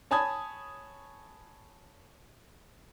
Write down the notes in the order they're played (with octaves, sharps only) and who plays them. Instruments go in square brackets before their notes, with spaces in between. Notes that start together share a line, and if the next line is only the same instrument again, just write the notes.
[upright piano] C#5 G#5 A5 B5 D#6 G#6